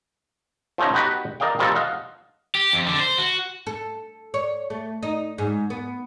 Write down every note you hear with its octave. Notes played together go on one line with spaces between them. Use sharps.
F3 A3 C#4 D#4
B3 D#4 F#4 G4 B4
A#4 D5 D#5 F5 G5
D#3 F3 G3 A#3 A4
D#5 F5 F#5
G4
F2
D3
C5
F#4
A4
C#5
A3
D#4
G#2
B3